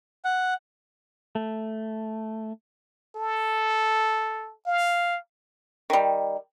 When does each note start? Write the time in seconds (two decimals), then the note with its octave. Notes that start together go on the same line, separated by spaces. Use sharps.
0.25 F#5
1.35 A3
3.16 A4
4.67 F5
5.90 D#3 G3